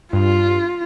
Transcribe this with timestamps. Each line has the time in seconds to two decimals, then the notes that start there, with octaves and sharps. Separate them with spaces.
0.13 G2 F4